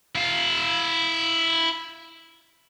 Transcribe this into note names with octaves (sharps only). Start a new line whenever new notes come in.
E4 F5